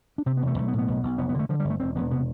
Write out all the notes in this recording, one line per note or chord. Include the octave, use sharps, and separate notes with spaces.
D4
C3 C4
B3
E1
A3
B1 A3
B3
A2
B3
B1
B1
F1 B3
B3
D3 A3
D3 F3
G3
G1
A3
E1 C4
E1 B3
C3 B3